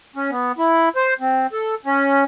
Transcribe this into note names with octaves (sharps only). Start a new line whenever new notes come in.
C#4
B3
E4
C5
C4
A4
C#4